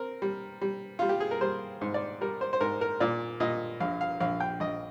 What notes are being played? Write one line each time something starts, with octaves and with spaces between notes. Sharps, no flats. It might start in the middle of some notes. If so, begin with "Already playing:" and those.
Already playing: C4 A#4
G3
G3
G3 F4
G4
G#4
A#4
G3 C5
G#2
D5
G3 A#4
C5
C5
G#2 A#4
A#4
A#2 D5
A#2 D#5
A#1 F5
F5
A#1 F5
G5
A#1 D#5